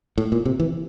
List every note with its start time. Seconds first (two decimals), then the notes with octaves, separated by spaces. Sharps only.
0.18 A2
0.32 A#2
0.45 C3
0.60 E3